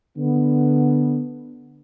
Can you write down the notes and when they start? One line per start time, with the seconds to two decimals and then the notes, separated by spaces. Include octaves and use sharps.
0.17 D3 B3